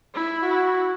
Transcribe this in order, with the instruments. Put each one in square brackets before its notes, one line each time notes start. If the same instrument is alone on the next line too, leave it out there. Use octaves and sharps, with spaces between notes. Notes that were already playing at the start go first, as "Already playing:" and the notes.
[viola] E4
[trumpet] F#4